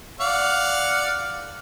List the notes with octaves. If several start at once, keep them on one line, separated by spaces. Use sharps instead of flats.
D5 F5 F#5